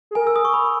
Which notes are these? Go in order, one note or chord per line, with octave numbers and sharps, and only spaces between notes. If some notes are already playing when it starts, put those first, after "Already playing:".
G#4
A#4 G#5
E6
D#6
C#6
B5